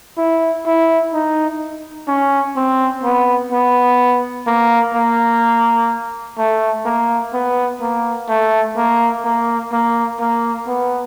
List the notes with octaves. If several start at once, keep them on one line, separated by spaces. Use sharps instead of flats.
E4
E4
D#4
C#4
C4
B3
B3
A#3
A#3
A3
A#3
B3
A#3
A3
A#3
A#3
A#3
A#3
B3